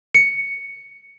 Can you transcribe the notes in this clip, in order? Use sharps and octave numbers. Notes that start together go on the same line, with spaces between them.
C#7